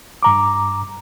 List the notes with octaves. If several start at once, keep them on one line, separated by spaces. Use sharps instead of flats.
G2 A#5 D6